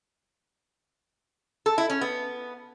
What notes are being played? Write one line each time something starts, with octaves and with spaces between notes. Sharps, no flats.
A4
E4
C#4
B3